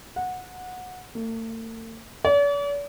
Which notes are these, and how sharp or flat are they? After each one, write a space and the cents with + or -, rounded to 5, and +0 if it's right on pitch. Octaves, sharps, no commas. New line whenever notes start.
F#5 -15
A3 +45
D5 -45